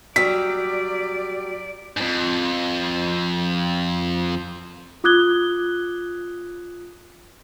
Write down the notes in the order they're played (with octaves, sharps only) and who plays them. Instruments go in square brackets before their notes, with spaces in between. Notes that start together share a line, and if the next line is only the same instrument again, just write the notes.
[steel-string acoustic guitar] F#3 G3 [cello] D5 [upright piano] B6
[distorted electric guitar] F2 G#2
[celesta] F4 D6 D#6 F#6 G#6 G7